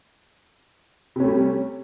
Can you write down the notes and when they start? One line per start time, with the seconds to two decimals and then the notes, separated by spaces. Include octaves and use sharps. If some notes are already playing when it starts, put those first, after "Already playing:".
1.16 C3
1.20 C#4
1.24 A3
1.28 G3